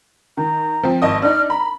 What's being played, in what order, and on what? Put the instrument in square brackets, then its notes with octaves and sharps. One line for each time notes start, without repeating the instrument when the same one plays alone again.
[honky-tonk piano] D#3 [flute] A#5
[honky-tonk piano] F3 C4
[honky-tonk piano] G#1 D#5 D#6 [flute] A5
[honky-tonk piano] D4 D#4 [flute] F6
[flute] A#5 [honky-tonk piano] B5